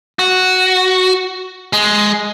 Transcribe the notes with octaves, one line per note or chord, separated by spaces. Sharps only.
F#4
G#3